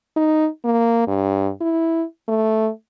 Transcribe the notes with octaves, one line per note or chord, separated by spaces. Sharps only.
D#4
A#3
G2
E4
A3